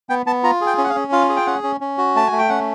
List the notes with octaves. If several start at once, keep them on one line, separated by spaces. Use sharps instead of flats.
B3 G5
B3 A5
F4 A#5
G#4
G5
C#4
F#5
F5
C#4
F4 F5
G#4
G5
C#4 F#5
C#4
C#4
F#4
A3 A5
G#5
A3
G5
C#4 F#5